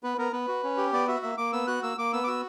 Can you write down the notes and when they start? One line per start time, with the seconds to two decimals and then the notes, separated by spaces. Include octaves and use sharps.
0.03 B3 B4
0.18 B3 A#4
0.32 B3 B4
0.48 F#4
0.63 C#4
0.77 G4
0.92 B3 D5
1.07 F#4 E5
1.22 A#3 E5
1.38 A#3 D6
1.53 B3 E6
1.67 F#4 F#6
1.83 A#3 E6
1.98 A#3 D6
2.13 B3 E6
2.24 D6
2.28 F#4 E6